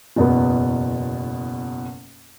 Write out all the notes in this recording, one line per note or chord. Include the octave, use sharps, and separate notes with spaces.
F#1 E2 B2 B3